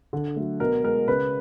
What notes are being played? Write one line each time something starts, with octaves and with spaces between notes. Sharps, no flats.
D3
F#3 A3
B2 A#4
G#3 A#4
C#3 B4